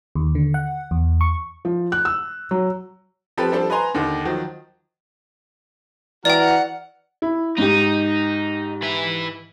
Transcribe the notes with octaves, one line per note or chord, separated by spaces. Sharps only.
D#2
D3
F#5
E2
C#6
F3
F#6
E6
F#3
F3 C4 G4 A4 B4
F3 G3 D4 A4 C5
B4 D#5 G#5 A#5 C6
D#2 D3 D#3
D#3 F3 F#3
E3 F#4 D5 G5 A#5 F6
F#5
E4
G#2 D#4 G4
E3 E5